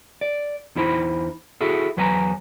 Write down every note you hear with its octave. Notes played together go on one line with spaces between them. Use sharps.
D5
E2 D#4 E4 C5 B5
E4 F#4 G#4 A4
E2 F#3 B4 C#5 G#5 A#5